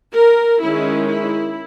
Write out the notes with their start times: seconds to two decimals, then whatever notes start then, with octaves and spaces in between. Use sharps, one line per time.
0.14 A#4
0.62 D#3 G#3 C#4 E4
1.09 E4